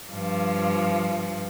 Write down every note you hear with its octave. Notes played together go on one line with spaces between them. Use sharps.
G2 F3